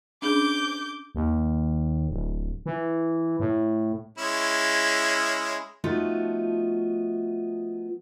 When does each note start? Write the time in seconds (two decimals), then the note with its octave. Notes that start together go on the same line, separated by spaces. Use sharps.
0.22 C#4 D4 G#4 D6 G6
1.15 D#2
2.10 D1
2.66 E3
3.40 A2
4.18 G#3 C#4 E4
5.84 F3 A3 B3 D#4 F4 F#4